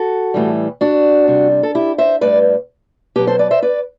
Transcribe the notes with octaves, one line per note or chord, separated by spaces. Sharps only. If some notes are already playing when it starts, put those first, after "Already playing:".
Already playing: F#4 A4
A2 E3 G3
D4 F#4
C3 G3
A4
E4 G4
C5 E5
A2 G3 B4 D5
B2 F#3 G4 B4
A4 C5
B4 D5
C5 E5
B4 D5